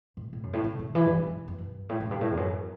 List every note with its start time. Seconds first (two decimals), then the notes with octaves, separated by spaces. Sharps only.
0.17 A2
0.33 A2
0.43 F#2
0.53 A2
0.64 C#3
0.79 C#3
0.95 E3
1.06 G2
1.16 G2
1.27 F#2
1.48 F#2
1.58 G2
1.89 A2
2.00 A2
2.06 F#2
2.11 G2
2.21 A2
2.31 E2
2.37 F#2